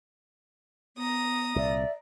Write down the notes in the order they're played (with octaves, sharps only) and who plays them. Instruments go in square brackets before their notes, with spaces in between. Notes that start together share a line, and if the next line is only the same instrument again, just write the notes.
[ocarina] B3 [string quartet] A#5 D#6
[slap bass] C2 A#2 [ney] D5 [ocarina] E5